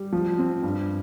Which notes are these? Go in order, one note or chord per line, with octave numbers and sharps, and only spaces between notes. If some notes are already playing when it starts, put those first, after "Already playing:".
Already playing: G3
F3
C4
G2